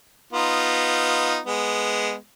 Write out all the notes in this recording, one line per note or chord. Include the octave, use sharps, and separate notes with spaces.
B3 D#4 F4
G#3 B3